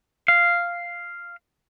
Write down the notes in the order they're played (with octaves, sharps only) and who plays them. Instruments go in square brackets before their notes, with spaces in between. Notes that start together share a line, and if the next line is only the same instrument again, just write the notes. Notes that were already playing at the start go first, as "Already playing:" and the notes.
[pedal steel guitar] F5